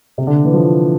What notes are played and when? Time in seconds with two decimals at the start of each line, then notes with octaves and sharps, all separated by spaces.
0.18 C3
0.27 D3
0.45 E3
0.54 F3